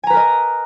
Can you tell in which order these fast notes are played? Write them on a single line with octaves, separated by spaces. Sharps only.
G#5 A#5 B4 A#4 D#5